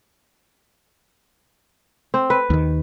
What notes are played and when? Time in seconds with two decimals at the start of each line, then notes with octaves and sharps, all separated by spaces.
2.14 C4
2.30 B4
2.50 D#2 D#3